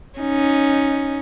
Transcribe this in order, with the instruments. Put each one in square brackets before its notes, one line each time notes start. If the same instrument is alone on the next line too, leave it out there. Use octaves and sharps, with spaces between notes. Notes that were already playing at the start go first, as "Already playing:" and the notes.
[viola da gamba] C#4 D#4